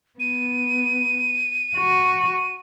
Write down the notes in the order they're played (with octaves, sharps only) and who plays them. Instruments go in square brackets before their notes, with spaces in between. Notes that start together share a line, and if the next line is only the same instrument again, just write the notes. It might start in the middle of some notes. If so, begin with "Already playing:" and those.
[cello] B3 [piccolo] D#7
[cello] F#4